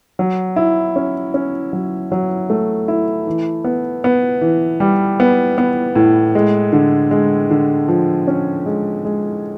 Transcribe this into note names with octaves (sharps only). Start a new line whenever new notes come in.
F#3
E4
C#4
C#4
F#3
F#3
A3
E4
E3
B3
B3
E3
G3
B3
B3
A2
G#3
D3
G#3
D3
F3
C#4
G#3
G#3